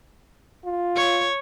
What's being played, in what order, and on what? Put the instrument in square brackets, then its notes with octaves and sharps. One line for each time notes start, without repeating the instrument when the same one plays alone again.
[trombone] F4
[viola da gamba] C#5